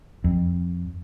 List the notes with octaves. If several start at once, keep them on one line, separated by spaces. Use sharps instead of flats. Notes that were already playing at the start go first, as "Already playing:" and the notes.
F2